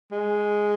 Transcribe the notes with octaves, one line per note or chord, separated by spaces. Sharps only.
G#3